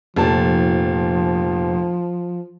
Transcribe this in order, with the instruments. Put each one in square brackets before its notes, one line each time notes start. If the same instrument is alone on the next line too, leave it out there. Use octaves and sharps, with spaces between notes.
[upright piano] F1 A#2 A5 [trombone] F3